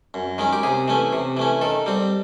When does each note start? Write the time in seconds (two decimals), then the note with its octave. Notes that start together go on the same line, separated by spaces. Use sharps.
0.14 F#2
0.38 D#3 G#3 C#4
0.53 G4
0.63 C3 G#4
0.88 E3 A3 C#4
1.13 C3
1.37 E3 A3 C#4
1.61 D#3 A4
1.86 G3 C4